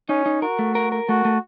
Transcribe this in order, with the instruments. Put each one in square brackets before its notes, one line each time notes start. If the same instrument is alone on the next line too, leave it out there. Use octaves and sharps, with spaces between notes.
[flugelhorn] C#4 [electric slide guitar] D#4
[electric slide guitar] D#4
[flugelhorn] F#4 [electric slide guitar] A#4
[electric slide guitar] A3
A#4
A#4
[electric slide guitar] A3 [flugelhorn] F#4
[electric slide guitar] A3